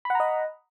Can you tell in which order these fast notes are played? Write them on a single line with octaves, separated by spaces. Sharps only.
B5 F#5 A#5 D#5